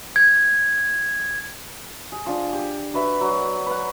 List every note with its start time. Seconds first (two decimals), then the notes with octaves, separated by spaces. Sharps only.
0.16 G#6
2.12 G#4
2.26 F3 D4
2.53 G4
2.93 D4 F#4 B4 E5
3.21 F#3
3.66 B4 F#5